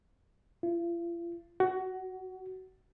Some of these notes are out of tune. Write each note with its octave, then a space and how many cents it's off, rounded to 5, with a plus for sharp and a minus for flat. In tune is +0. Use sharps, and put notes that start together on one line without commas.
F4 -45
F#4 +20